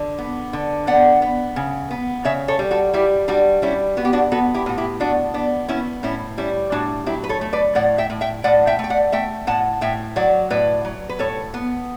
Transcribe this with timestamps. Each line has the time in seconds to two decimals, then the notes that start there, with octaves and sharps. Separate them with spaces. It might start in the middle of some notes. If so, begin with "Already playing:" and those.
Already playing: D3
0.18 B3
0.53 D3
0.87 B3 D5 F#5
1.22 B3
1.56 C#3
1.91 B3
2.25 C#3 C#5 E5
2.48 A4 C#5
2.59 G3
2.71 F#4 A4
2.93 G3 E4 G4
3.28 G3 D4 F#4
3.62 G3 C#4 E4
3.97 B3 F#4
4.05 G4
4.13 D4 F#4
4.32 B3 F#4 A4
4.54 E4 G4
4.66 A2 F#4
4.78 E4 G4
5.00 B3 D4 F#4
5.34 B3 D4
5.68 B3 C#4 E4
6.03 A2 C#4 E4
6.38 G3 C#4 E4
6.72 A2 D4 F#4
7.06 F#3 E4 G4
7.24 B4
7.29 A4 C#5
7.41 A3
7.53 B4 D5
7.75 A2 D5 F#5
7.98 E5 G5
8.10 A2
8.21 E5 G5
8.44 A2 D5 F#5
8.67 E5 G5
8.79 A3
8.84 G5
8.90 D5 F#5
9.12 A3 E5 G5
9.47 A2 F#5 A5
9.81 A2 E5 G5
10.16 F#3 D5 F#5
10.50 A2 B4 D5
10.85 F#3
11.09 B4
11.19 A2 A4 C#5
11.54 B3